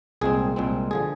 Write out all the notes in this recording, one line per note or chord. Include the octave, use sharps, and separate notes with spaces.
C2 A#2 G#3 C4 G#4
C2 A#2 G#3 C4
D3 F3 G#4